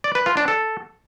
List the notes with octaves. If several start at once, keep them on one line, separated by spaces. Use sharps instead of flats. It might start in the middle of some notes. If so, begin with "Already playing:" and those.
D5
B4
F4
D4
A4